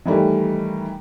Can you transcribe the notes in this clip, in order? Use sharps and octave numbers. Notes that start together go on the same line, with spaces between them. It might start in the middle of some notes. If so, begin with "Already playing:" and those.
D#3 E3 G3 A3